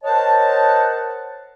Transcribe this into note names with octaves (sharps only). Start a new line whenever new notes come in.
A#4 C5 C#5 D#5 F#5 A5